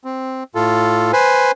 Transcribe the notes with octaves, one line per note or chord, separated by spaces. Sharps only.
C4
A2 F4 A4
B4 C5 G#5